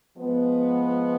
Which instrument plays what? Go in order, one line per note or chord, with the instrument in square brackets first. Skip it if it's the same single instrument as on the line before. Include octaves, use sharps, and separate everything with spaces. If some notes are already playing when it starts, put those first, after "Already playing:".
[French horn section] F3 G#3 B3